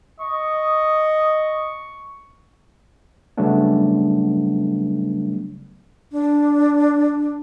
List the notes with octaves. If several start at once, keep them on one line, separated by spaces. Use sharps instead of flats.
D#5 C#6
C#3 F#3 G3 A3 B3 D4
D4